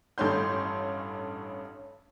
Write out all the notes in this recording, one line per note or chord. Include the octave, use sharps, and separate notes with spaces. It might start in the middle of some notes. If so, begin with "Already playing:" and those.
A1 G2 A3 C#4 C6 G6